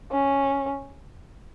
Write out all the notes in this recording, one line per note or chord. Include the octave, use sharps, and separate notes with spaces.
C#4